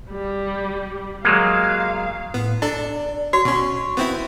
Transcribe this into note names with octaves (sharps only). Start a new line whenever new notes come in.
G3
F#3 G#3 A#3 F5
A2 B3
D4 E4 A4 D5
F#4 C#5
B2 C#4 C#6
B3 C4 E4